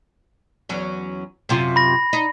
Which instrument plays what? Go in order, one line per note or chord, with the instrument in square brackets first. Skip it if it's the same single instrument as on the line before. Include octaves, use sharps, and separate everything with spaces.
[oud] E2 F#3 C#4
F#2 C3 F4
[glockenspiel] B5 A#6
[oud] D#4